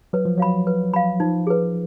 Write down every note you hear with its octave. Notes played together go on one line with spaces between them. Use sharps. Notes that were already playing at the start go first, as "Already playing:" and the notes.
F#3 B4
F3
F#3 F5 B5
B4
F5 B5
F3 D#4
G#4 B4